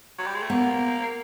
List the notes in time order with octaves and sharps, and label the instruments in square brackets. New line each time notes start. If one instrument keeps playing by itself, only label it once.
[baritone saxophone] F#3
G3
G#3
A3
[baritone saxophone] A#3 [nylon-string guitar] B3